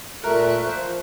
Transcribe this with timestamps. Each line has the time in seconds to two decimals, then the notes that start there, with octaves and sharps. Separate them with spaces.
0.24 A#2 A3 A#4 E5 C#6 F#6
0.66 F3 C5